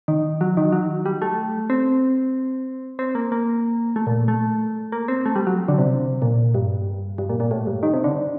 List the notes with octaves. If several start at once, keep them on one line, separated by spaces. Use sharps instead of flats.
D#3
F#3
D#3
F#3
G3
A3
C4
C4
A#3
A#3
A3
A#2
A3
A#3
C4
A3
G3
F#3
D3
C3
A#2
G2
G2
A#2
A#2
A2
G2
D#3
C3
D3